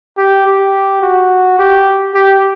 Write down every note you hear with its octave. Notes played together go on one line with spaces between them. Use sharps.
G4
G4
F#4
G4
G4